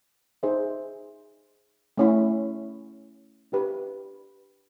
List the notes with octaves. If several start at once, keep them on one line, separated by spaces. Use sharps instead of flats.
D#4 G#4 C5 E5
A3 C#4 E4
D4 G4 B4